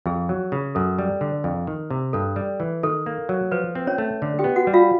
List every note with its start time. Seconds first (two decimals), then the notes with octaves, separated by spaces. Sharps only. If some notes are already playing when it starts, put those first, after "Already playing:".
0.06 F2 G#4
0.29 F#3
0.52 C#3
0.75 F#2 A4
0.99 G3
1.21 D3
1.44 F2
1.67 D#3
1.90 C3
2.13 G2 A4
2.36 G3
2.60 E3
2.83 D#3 A4
3.06 A#3
3.29 F#3
3.52 F3 B4
3.75 C4
3.87 C#4 C#5
3.98 A3
4.22 D3
4.39 G4 G5
4.44 B3
4.56 F#4 F#5
4.67 G3
4.73 F4 F5